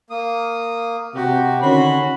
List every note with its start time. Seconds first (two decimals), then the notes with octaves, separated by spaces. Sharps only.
0.10 A#3 D#6
1.15 C3 F#4 G4
1.62 D3 D#3 C#4 F#4 B5 C6